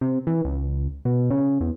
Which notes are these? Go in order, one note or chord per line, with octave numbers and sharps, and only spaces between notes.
C3
E3
C#2
B2
C#3
E2